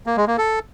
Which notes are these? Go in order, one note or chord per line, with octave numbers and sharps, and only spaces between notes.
A#3
G#3
A#3
A4